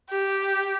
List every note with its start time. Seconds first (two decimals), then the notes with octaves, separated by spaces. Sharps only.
0.10 G4